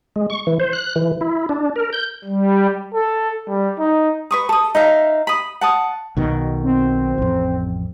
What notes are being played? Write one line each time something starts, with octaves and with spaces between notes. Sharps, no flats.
G#3
C#6
E3
C5
F#6
E3
E4
D4
A#4
G6
G3
A4
G3
D#4
B4 C#6 D#6
A4 D#6
D#4 E5 F5
B5 D#6
F#5 A5 D#6
B1 B2 D#3
C4
A1 F2